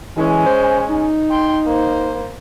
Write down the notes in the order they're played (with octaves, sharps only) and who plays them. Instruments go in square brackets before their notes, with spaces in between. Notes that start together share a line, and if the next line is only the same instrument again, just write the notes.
[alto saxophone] E3 [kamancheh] G#3 C#4
[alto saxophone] C5
D#4
[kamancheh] G5 C6
A#3 C5